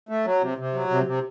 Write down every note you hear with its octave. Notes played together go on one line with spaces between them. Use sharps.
A3
F#3
C3
C3
F#3
C3
C3